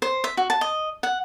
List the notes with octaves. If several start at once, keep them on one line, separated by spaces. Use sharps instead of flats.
C5
E5
F#4
A5
D#5
F#5